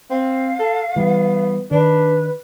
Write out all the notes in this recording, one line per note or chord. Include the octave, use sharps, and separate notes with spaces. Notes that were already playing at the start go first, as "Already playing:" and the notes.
C4 F5
A4
E3 G3 B3
D#3 D4 B4